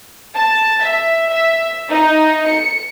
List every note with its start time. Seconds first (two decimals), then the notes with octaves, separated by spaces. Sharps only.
0.35 A5
0.84 E5
1.30 E5
1.90 D#4
2.48 C#7